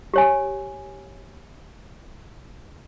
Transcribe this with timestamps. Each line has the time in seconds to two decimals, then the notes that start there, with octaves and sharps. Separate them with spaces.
0.14 G4 C#5 G#5